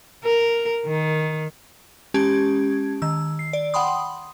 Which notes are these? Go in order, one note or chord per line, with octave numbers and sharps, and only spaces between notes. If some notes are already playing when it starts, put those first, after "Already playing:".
A#4
D#3
G#3 C#4 G4 A5 G#6
D#3 E6
C7
D5
F#5 G5 B5 C6 D#6